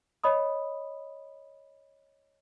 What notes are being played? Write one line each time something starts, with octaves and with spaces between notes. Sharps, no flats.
C#5 D#5 B5 D#6